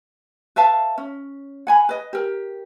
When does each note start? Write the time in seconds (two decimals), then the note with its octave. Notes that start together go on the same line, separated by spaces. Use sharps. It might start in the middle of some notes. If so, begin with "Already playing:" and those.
0.56 B4 E5 F5 A5
0.98 C#4
1.67 F#5 G#5 B5
1.89 B4 D#5
2.13 G4 A#4